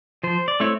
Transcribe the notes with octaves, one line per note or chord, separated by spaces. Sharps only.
F3 C5
D5
A3 C4 E4 C#5